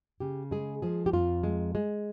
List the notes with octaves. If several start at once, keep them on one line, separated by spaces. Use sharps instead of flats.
C#3 G4
G#3 G#4
F3 G#4
G4
F2 F4
G#3
G#3